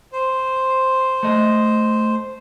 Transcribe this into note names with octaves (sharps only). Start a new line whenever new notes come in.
C5
A3 D#5